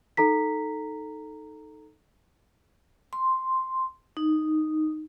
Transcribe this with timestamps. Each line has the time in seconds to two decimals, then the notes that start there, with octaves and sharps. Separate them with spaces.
0.17 D#4 A4 A#5 B6
3.13 C6
4.17 D#4